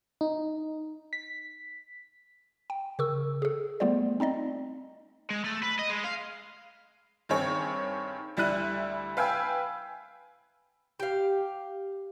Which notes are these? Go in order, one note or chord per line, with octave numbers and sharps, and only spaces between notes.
D#4
B6
G5
C#3 A#4 C#6 E6
G#4 A4
G3 A3 B3 F4 C5 D5
C4 D#4 D5 D#5
G#3
A3
B4
D#5
G#3
F5
G2 D#3 C4 G#4 C#5
D2 G3 E4 E5 F#6 D#7
B4 F5 G5 G#5 E6
G4 F5